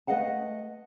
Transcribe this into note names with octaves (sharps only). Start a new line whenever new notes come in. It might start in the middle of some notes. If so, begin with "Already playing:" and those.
A3 B4 D#5 F5 F#5 A5